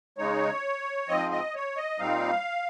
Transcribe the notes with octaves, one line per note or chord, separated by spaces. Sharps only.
C#3 G#3 D#4 C#5
G#2 F3 C4 D#5
D#5
C#5
D#5
A#2 G3 C4 D#4 F5